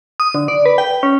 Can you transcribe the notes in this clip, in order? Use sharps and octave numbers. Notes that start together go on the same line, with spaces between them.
D#6
D3
D5
B4
G5
C#4